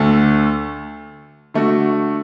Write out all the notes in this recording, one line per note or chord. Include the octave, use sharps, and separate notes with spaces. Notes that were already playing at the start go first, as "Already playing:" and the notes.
Already playing: D2 D3 A3
D3 A3 F#4